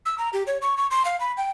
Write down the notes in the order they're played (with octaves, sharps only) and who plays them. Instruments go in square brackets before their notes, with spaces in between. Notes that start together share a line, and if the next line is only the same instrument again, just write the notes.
[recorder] E6
A#5
G4
C#5
C#6
C#6
C6
F5
B5
G5